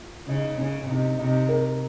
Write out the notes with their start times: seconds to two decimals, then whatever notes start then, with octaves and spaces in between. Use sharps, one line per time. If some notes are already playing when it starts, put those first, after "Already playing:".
Already playing: F4
0.28 C#3 D#4
0.58 C#3 C#4
0.88 C3 D#4
1.19 C3 D#4
1.49 A#4